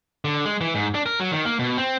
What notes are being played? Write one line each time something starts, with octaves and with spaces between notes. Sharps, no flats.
D3
G#3
E3
G#2
D4
A#4
F#3
D#3
A#3
B2
C4